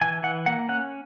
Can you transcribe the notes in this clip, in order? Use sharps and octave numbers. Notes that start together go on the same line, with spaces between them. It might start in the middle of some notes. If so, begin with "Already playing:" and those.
E3 G#5
E3 F#5
A#3 F#5
C#4 F#5